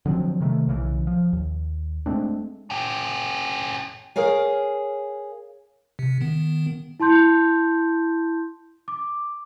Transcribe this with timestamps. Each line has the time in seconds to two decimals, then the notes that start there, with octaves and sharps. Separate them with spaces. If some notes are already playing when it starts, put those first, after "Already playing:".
0.06 D3 F3 F#3 C4
0.40 C3 D#3 F#3 A3
0.68 B1 C#3 E3
1.07 F3
1.33 D#2
2.06 G#3 A3 C4 D4
2.70 C#4 G4
4.16 G#4 A#4 C#5 F5 G#5
5.99 C3
6.21 D#3 B3
7.00 E4 A5 C6 G6
8.88 D6